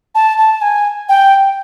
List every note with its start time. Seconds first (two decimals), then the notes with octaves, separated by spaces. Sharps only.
0.15 A5
0.38 A5
0.62 G#5
1.09 G5